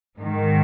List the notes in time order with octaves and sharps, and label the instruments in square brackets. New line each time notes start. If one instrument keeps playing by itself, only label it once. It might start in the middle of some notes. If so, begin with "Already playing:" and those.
[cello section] G#2 D#3